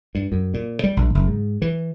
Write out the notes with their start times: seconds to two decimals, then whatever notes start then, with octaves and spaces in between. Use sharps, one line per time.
0.15 G2
0.32 F#2
0.54 A#2
0.84 G3
0.97 A#1
1.15 F#1
1.27 G#2
1.62 E3